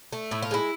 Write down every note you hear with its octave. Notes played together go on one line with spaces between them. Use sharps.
A3
A2 E4
F4
G#3 E4